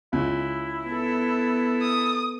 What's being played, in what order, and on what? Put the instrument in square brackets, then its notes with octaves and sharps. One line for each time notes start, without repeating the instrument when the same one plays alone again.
[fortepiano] C#2 [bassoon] E4
[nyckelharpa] B3 A4
[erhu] D#6